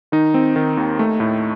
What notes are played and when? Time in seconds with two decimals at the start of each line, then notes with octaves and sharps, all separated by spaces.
0.12 D#3 D#4
0.34 C4
0.56 D#3
0.77 D#2
0.99 A3
1.20 A2